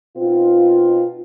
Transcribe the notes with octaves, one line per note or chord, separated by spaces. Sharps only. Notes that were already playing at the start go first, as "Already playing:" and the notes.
B2 C4 D#4 F4